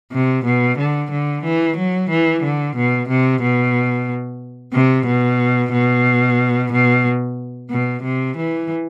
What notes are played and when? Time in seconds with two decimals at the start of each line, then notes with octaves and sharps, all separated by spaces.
0.12 C3
0.45 B2
0.78 D3
1.11 D3
1.44 E3
1.77 F#3
2.10 E3
2.44 D3
2.76 B2
3.09 C3
3.42 B2
4.73 C3
5.07 B2
5.73 B2
6.72 B2
7.70 B2
8.03 C3
8.37 E3